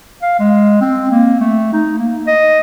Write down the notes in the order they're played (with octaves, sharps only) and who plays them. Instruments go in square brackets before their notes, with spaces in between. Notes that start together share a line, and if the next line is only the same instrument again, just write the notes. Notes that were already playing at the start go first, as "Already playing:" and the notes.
[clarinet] F5
G#3
C4
A#3
A3
D#4
A#3
D#5